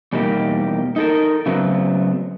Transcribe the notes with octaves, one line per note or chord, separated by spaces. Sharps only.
E2 B2 G3 A#3 D#4 G4
D#4 A4 A#4
C#3 F#3 A3 B3 C4